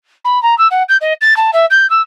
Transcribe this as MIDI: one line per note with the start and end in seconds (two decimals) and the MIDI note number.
0.25 0.41 83
0.43 0.57 82
0.58 0.68 88
0.71 0.83 78
0.89 0.97 91
1.01 1.13 75
1.21 1.36 93
1.37 1.51 81
1.53 1.66 76
1.70 1.89 91
1.90 2.02 88